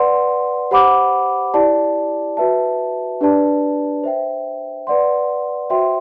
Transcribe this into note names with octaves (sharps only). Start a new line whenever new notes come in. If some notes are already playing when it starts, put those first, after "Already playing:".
Already playing: B4 D5 F#5 C6
G4 C5 F#5 B5 D6
E4 G4 D5 A5
F#4 B4 E5 A5
D4 G4 B4 D5 A5
C5 E5 G5
B4 D5 F#5 C6
F#4 C5 E5 G5 C6